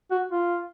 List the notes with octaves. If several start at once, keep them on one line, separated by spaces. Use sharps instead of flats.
F#4
F4